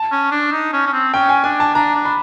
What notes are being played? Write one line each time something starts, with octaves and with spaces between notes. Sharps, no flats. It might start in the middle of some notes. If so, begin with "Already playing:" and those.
Already playing: A5
C#4
D4
D#4
C#4
C#4
C4
C#4 G5
G#5
D4 G#5
A5
D4 A#5
D4
B5